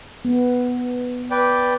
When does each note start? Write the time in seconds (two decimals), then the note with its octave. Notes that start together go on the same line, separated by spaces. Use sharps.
0.25 B3
1.31 B4 D5 G5